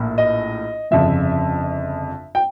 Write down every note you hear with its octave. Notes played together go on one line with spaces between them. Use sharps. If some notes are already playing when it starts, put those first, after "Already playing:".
Already playing: A#1 A2 A#3
D#5
G1 F2 C#3 F3 E5
G5